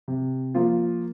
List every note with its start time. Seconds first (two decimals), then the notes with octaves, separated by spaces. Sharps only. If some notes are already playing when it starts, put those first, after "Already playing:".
0.08 C3
0.55 F3 A#3 F4